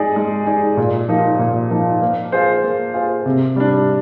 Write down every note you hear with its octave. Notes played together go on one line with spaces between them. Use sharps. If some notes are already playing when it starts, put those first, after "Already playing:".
Already playing: G#3 D#4 G#4 D5
G#3
D#4 G#4 D5
A#2
F3 A#3 D#4
A#2
F3 A#3 D#4
A#3
F4 G#4 C5
A#3
F4 G#4 C5
C3
G3 D4